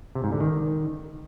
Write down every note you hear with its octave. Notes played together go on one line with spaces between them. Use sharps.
C3
G#2
D3
D#3